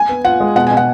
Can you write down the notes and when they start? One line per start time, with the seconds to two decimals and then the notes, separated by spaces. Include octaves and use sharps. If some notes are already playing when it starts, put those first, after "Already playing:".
Already playing: G#5
0.09 B3
0.25 F4 F#5
0.40 G#3
0.56 B2 F#5
0.67 G#5
0.71 B2
0.77 F#5